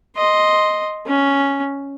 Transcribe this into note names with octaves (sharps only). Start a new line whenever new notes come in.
D#5 C6
C#4